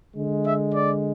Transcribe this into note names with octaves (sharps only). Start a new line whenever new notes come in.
D3 G#3
E5
D5